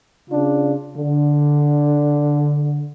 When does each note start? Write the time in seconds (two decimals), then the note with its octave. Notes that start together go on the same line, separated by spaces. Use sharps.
0.30 C#3 D4 F4
0.95 D3